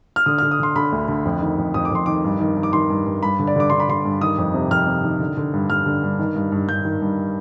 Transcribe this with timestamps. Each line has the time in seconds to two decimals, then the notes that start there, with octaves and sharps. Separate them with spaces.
0.16 F6
0.26 D3 D#6
0.38 D3 F6
0.51 D#6
0.60 D3 C6
0.76 D3 B5
0.92 D2
1.08 D3
1.25 F2
1.41 D#3
1.58 F2
1.74 F2 D#6
1.85 D6
1.91 F2 C6
2.06 D#3 D6
2.24 G2
2.40 D#3
2.56 D#3
2.63 D6
2.73 D#3 C6
2.90 G2
3.06 G2
3.23 G2 B5
3.39 D3
3.47 D5
3.56 D3 D6
3.70 D3 C6
3.80 B5
3.89 D3 C6
4.05 G2
4.21 D#3 D#6
4.38 F2
4.54 C3
4.71 F2 F6
4.87 C3
5.04 D#3
5.20 D3
5.37 D3
5.53 G2
5.70 G2 F6
5.86 D3
6.03 G2
6.19 D#3
6.36 G2
6.52 G2
6.68 G2 G6
6.85 D#3
7.02 G2